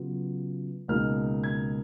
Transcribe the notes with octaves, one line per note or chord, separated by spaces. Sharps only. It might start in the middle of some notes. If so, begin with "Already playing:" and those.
Already playing: C#3 F#3 B3 F4
C#2 B2 A#3 D#4 F6
G#6